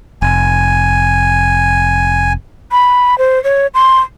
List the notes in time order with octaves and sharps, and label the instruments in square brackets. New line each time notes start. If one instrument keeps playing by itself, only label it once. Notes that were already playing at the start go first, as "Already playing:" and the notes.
[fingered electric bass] F1 [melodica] G#5
[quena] B5
C5
C#5
C6